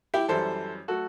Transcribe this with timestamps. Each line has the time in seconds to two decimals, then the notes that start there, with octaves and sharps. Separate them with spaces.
0.14 E4 G4
0.28 F#2 E3 G3 A4 C5
0.88 F#3 A3 F#4 A4